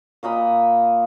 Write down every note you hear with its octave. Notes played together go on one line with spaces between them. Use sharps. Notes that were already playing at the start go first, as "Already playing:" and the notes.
A#2 A#4 D#5 B5